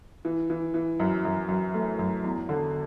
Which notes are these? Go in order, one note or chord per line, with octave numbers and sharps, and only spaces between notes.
E3
E3
E3
F#2
F#2
F#2
A3
F#2
E2
D3